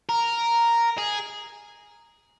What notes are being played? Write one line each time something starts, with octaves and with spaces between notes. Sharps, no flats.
A#4
G#4